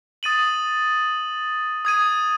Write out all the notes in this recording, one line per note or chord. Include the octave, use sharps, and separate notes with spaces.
D#6 A6 D#7 F#7
D#6 G#6 D#7